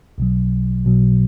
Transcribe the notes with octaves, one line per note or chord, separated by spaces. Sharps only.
B1 B2 F#3
B1 B2 F#3